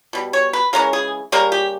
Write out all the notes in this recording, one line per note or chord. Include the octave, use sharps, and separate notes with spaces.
B2 G3
C#5
B4
C#3 E3 G#3 C#4 A#4
G#4
C#3 G3 A#3 C#4 A#4
G4